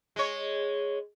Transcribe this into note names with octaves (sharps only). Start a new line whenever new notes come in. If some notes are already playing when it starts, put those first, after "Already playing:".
G#3 C#5